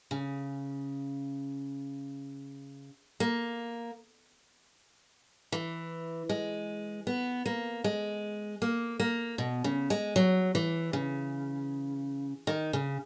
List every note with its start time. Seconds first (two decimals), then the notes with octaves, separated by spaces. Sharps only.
0.11 C#3
3.20 A#3
5.52 E3
6.29 G#3
7.07 B3
7.46 A#3
7.84 G#3
8.62 A#3
9.00 A#3
9.38 B2
9.64 C#3
9.90 G#3
10.16 F#3
10.55 E3
10.93 C#3
12.47 D#3
12.73 C#3